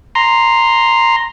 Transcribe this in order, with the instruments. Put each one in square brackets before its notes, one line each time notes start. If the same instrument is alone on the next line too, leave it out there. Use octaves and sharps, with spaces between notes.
[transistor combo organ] A#5 C6